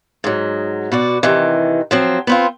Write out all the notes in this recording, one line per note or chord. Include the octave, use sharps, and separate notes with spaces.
G#2 F#3
B2 F#4 D5
C3 D#3 E3
F3 F#3 C4
B3 C4 F4